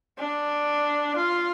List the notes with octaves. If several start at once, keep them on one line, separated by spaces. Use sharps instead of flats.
D4
F4